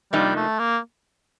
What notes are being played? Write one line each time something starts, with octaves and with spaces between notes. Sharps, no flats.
F2 C3 F3 G3 A#3 D#4
A3
A#3